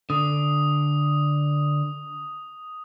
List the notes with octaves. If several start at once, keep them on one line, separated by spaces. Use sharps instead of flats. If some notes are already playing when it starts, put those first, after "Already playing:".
D3 D#6